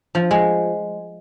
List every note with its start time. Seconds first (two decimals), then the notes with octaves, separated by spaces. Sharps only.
0.15 F3
0.31 G#3